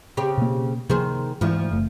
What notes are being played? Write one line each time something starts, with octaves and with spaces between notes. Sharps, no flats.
C#3 C4 G4
B2 A#3
C3 D#3 F3 A#3 G#4 C5
D2 G#2 E3 F3
F#1 A3